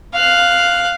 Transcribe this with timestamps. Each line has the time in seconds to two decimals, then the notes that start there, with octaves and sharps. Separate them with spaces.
0.13 F5 F#6